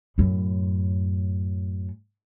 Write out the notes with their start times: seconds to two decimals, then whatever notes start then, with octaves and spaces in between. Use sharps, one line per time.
0.18 F#2 A2